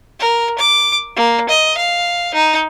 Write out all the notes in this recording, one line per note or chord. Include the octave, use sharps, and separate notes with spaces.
A#4
D6
A#3
D#5
F5
D#4